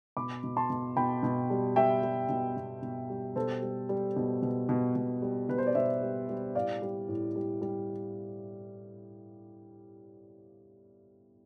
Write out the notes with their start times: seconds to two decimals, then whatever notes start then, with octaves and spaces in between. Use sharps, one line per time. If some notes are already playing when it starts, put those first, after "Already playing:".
0.17 B2 B5 D6
0.44 B2
0.57 A5 C6
0.70 B2
0.97 B2 G5 B5
1.23 B2
1.50 G3
1.76 G3 E5 G5
2.03 G3
2.29 B2
2.57 B2
2.82 B2
3.10 G3
3.36 B2 A4 C5
3.62 G3
3.89 G3
4.16 B2
4.42 B2
4.69 B2
4.96 B2
5.22 G3
5.49 B2 B4
5.58 C5
5.67 D5
5.75 B2 C5 E5
6.02 G3
6.29 G3
6.55 A2 D5 F5
6.82 G3
7.08 A2
7.36 G3
7.61 G3